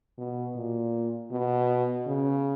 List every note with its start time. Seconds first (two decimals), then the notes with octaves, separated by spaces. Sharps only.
0.18 B2
0.55 A#2
1.31 B2
2.06 C#3